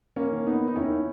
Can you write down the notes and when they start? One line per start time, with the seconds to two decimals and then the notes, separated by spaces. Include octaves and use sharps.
0.16 A#3 C#4
0.32 D#3
0.47 B3 D#4
0.68 D#4
0.76 D#2 C#4 E4